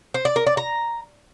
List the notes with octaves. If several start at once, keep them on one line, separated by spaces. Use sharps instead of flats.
C5
D5
A#4
D5
A#5